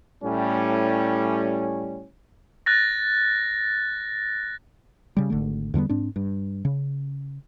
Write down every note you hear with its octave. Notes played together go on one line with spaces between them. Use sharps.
A2 G3 C#4
F#6 A6 A#6
C#3 G3
G#1 D3 A3
E2 D3 G3 B3
G#2 C4 D4
G2
C#3